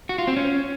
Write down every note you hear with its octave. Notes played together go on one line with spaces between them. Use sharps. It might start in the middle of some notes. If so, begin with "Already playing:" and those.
F#4
F4
C4
C#4